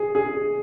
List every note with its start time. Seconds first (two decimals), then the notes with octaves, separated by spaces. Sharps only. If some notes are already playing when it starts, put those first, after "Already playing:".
Already playing: G#4
0.15 G#4